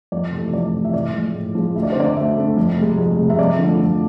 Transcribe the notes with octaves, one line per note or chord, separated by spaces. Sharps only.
F2 D5
C3 E3 A3
F2 D5
C3 E3 A3
E5
A2 D5
F3 G#3
A2
F3 G#3
D2 E5
D5
C5
D3 A3 D5
D2 E5
D3 A3
F2
C3 G#3
F2
C3 G#3
E5
F2 D5
D3 F3 A3
F2